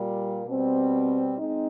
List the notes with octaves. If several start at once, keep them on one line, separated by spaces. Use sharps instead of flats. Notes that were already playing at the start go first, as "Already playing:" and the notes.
Already playing: A#2 G3 A#3
B2 G3 C4
G#3 C4 D#4